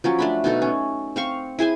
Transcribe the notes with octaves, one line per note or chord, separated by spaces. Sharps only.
F3 F#3 C#4
A3 D4 B5
B2 D#4 A4
C#4
C4 F5 C#6
E4 G#4 C5 G#5